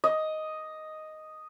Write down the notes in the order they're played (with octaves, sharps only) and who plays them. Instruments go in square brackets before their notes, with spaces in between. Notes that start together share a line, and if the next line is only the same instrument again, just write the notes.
[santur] D#5